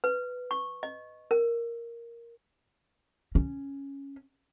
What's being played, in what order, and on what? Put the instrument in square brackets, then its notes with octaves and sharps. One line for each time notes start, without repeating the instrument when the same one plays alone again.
[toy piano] B4
C#6
D#5
A#4
[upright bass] C#4